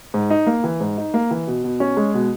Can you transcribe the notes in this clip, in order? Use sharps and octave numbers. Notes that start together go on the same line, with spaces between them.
G#2
D#4
A#3
E3
G#2
D#4
A#3
E3
B2
B2
C#4
G#3
B2